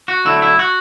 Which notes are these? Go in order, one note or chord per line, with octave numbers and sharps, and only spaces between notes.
F#4
D3 F#3 A3 E4
E4
F#4